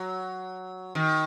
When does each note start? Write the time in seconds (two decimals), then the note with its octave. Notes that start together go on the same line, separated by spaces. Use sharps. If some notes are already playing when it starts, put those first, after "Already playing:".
Already playing: F#3
0.95 D#3